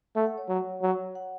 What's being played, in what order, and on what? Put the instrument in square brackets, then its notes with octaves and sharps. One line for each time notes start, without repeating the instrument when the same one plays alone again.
[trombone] A3 [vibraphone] F#5
[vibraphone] F#5
C#5
[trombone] F#3
F#3
[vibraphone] F#5